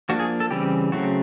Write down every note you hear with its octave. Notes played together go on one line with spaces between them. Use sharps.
F3 A#3 D4 F#4
G#4
A4
C#3 E3 G3 C4 G4
C#3 F#3 A3 C4 F#4